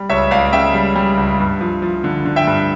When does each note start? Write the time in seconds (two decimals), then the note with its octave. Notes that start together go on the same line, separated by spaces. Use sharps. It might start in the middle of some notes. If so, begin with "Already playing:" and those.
Already playing: G3
0.09 C#2 C#5 E5
0.31 C#2 D5 F5
0.53 C#3 E5 G5
0.74 G3
0.96 G3
1.18 C#2
1.40 G2
1.61 F3
1.82 F3
2.04 D3
2.25 D3
2.36 E5 G5
2.47 G2